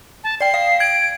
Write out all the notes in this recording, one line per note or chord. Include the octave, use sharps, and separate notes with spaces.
A5
D5 G5 C7
F5
G#6 D7